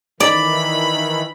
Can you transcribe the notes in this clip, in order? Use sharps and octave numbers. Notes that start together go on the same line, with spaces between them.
D#3 E3 D#4 D5 B5